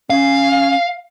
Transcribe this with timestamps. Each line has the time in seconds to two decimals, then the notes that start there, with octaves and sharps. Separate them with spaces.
0.10 C#4 F5